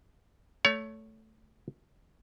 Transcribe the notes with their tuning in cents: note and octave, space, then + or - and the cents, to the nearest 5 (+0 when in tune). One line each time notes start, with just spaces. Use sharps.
A3 +0 C#5 +25